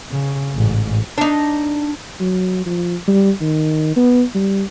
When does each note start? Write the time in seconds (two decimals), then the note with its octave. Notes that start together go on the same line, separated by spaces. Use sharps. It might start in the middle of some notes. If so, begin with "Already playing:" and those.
0.11 C#3
0.55 A1 G#2
1.18 D4 D#4
2.20 F#3
2.66 F3
3.08 G3
3.41 D#3
3.96 B3
4.35 G3